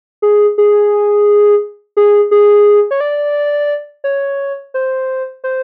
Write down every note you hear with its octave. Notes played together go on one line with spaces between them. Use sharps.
G#4
G#4
G#4
G#4
C#5
D5
C#5
C5
C5